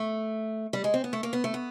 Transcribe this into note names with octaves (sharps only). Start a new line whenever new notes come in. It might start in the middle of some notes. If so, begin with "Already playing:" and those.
Already playing: A3
G3
G#3
C4
B3
A3
A#3
B3
A3
B3